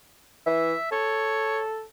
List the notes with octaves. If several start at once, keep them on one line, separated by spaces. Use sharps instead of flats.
E3 E5
A4 C#5